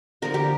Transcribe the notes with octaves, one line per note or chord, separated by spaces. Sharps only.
D3 F3 A#3 A#4
G4